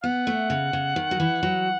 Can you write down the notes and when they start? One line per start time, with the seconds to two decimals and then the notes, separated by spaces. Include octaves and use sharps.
0.04 B3 F#5
0.27 A3
0.50 C#3
0.73 C#3
0.96 D#3
1.11 F#3
1.20 E3
1.43 F#3